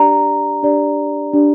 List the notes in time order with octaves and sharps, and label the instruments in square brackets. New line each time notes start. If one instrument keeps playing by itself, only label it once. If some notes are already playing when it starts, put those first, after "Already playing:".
Already playing: [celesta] D4 G4 D5 A#5
D4 G4 D5
D4 G4 D5